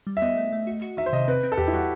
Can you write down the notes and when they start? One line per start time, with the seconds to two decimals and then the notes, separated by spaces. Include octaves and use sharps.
0.07 G3
0.17 E5
0.22 B3 D#5
0.37 A3
0.52 A3
0.67 F#4
0.82 F#4
0.97 D#3 E5
1.06 C5
1.13 C3 D#5
1.28 C4 B4
1.43 C4
1.52 A4
1.57 E2 G4
1.68 E4
1.73 G3 F#4